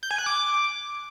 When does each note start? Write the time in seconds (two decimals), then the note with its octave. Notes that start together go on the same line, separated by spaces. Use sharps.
0.03 G6
0.11 G#5
0.18 F#6
0.26 D6